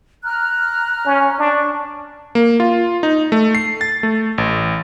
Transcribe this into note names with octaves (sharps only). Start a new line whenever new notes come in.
A#5 F6 F#6
C#4
D4 C#6
A#3
F4
D#4
A3
C7
A6
A3
A1